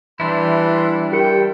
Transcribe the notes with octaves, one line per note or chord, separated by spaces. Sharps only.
E3 G3 D4 E4 C6
G4 A#4 G5 C#7